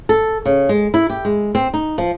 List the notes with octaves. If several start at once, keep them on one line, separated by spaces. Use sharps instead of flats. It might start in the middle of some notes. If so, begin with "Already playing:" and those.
A4
C#3
G#3
E4
G4
G#3
C4
D#4
F3